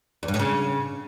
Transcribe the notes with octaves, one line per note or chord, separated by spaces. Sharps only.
E2
G2
A2
C#3